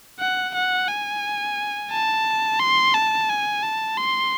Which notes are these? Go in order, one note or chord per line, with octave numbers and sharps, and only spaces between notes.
F#5
F#5
G#5
A5
C6
A5
G#5
A5
C6